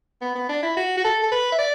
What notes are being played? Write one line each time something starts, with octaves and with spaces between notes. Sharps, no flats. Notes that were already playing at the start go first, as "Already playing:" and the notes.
B3
B3
D4
E4
F#4
F#4
A4
A4
B4
E5
D5